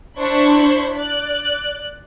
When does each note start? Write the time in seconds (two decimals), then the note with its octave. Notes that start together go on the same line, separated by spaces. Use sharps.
0.18 D4 E4 C5 B5 C#6
0.95 D5 F#6